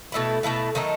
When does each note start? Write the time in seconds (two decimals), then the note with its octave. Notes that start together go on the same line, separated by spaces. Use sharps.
0.12 B2 A3 E4 B4
0.43 B2 A3 E4 B4
0.75 D#3 F#3 A3 D#4